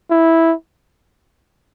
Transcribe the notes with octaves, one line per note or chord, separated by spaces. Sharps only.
E4